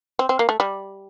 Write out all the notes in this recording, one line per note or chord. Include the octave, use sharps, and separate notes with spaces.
C4
C4
A#3
A3
G3